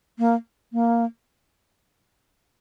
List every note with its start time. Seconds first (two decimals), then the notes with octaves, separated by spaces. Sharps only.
0.19 A#3
0.73 A#3